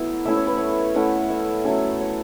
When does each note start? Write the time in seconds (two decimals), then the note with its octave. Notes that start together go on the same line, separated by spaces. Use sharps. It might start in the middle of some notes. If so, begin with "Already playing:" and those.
Already playing: F#3 A3 B3 E4 B4 E5
0.26 A3 C#4 E4 E5
0.36 C#5
0.47 B4
0.58 C#5
0.95 A3 C#4 E4 F#5
1.30 E5
1.65 F#3 A3 C#4 A4
2.01 C#5